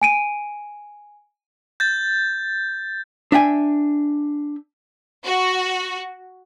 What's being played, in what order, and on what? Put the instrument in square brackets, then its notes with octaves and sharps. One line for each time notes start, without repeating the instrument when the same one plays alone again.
[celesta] G#5 D7 D#7
[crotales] G6 A6
[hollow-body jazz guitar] D4 E5 G5 G#5
[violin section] F#4